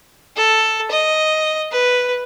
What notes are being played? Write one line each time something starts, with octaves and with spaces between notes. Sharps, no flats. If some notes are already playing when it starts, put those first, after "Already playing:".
A4
D#5
B4